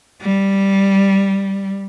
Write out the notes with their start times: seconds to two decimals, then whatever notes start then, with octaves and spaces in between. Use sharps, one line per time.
0.22 G3